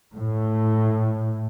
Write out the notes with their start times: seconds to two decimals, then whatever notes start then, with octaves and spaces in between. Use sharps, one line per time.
0.16 A2